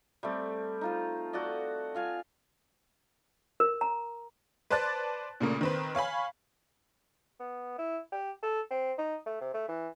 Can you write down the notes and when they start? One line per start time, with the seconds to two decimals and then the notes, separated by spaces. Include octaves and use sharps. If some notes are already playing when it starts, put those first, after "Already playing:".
0.23 G3 A3 C4
0.81 D#4 F4 C5
1.33 F#4 A4 D5 D#5
1.95 F4 F5 G#5
3.60 A#4
3.81 A#5
4.70 B4 C5 D5 A5 F#6 A6
5.41 A#2 C#3 A3 A#3
5.61 D#3 C4 B4
5.95 C#5 F5 G#5 B5
7.40 B3
7.78 E4
8.12 G4
8.43 A4
8.71 C4
8.98 D#4
9.26 A3
9.41 C3
9.54 A3
9.69 E3